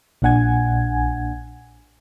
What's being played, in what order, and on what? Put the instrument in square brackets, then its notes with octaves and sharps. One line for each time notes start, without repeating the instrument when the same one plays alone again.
[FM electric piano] A#1 A#2 D4 F#5 G#5 G#6